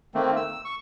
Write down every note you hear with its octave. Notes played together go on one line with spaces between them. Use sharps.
D#3 A3 A#3 C4
E6
C#6